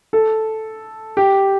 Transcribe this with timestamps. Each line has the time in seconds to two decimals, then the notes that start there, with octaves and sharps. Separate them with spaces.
0.13 A4
1.17 G4